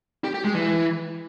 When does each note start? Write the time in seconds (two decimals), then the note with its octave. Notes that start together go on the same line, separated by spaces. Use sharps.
0.24 G4
0.34 G4
0.44 G#3
0.55 E3